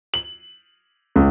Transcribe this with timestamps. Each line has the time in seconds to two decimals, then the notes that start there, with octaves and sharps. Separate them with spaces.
0.14 F#7
1.16 C#2